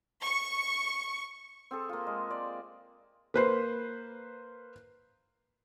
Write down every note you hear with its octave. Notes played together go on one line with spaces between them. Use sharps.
C#6
C4 G#4 A4
A#3 F4
G#3
D5
A#3 B4 C5